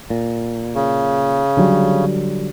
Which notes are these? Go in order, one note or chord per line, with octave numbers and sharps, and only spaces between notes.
A#2
C#3
D3 F#3 G3